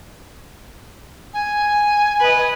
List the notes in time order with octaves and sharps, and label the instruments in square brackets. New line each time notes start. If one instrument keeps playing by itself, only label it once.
[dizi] G#5
[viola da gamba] B4 D#5